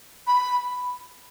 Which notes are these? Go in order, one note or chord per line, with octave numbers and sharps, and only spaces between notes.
B5